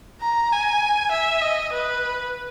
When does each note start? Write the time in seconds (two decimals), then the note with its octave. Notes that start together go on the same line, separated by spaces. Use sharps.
0.21 A#5
0.52 G#5
1.12 E5
1.42 D#5
1.73 B4